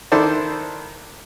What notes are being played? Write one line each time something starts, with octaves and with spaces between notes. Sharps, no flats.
D#3 D4 E4 A4 C5 D5